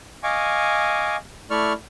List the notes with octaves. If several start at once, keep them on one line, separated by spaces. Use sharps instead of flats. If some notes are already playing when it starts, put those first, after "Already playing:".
D#5 F5 G#5 C#6 D6
A3 E4 D5 C#6 F6